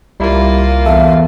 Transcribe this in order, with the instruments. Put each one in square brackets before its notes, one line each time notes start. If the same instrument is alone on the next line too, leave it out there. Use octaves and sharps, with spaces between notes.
[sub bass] C2 [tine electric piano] G3 E4 [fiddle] A#3 F4
[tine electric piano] E2 A4 [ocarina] E5